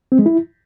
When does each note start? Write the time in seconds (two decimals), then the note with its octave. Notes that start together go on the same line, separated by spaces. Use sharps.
0.12 C4
0.19 G#3
0.26 E4